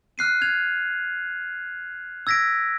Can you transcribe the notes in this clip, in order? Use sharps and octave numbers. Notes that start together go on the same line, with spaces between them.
F6 F#6 C7 D#7
G#6 F7
E6 G#6 A#6 B6 D7